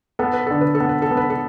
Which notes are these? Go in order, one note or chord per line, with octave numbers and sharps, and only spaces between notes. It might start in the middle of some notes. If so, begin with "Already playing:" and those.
B3 A4
B4
D3 A4
B4
A4
B3
B4
A4
B3
B4
A4